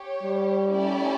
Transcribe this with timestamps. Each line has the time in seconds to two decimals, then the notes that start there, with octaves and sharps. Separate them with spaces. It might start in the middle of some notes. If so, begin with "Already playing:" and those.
Already playing: G4 C#5 G5
0.22 G3
0.70 A3 C#4 E4 G4 D5